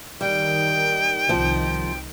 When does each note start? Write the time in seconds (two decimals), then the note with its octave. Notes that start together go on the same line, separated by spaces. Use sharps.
0.21 D#3 G3 G5
1.29 C2 D#3 F3